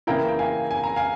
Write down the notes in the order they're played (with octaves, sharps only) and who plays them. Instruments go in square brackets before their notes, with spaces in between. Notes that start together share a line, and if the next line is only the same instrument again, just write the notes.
[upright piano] C#3 E3 A#3 E4 G5 A#5
G5
F5 G#5
G#5
A#5
F5 G#5